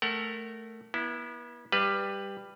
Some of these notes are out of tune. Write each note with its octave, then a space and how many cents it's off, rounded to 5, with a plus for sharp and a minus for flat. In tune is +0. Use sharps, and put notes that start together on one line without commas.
A3 -5 A#4 -10 F#5 +25
B3 -35 E4 +0
G3 +10 B4 +0 F5 -25